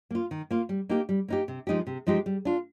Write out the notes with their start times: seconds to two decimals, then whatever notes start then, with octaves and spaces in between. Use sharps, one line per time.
0.11 A#3 F4
0.31 D#3
0.51 A#3 F4
0.69 G3
0.89 A#3 D#4 G4
1.09 G3
1.28 A#3 D#4 G4
1.48 C3
1.67 F3 G#3 D#4 G4
1.87 C3
2.07 F3 G#3 D#4 G4
2.26 G3
2.45 D4 F4